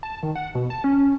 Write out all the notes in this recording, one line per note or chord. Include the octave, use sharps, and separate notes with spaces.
A5
D#3
F#5
B2
A5
C#4